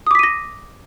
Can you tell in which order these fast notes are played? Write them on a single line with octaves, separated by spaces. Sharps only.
D#6 D6 B6 D#7 A#6